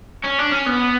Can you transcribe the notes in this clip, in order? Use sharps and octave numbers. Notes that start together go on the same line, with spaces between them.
C#4
D4
C#4
B3